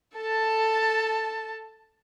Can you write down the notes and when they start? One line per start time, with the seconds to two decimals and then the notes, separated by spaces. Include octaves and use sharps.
0.16 A4 A5